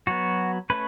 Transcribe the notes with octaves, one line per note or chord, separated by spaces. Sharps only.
F#3 B3 F#4
A3 C#4 B4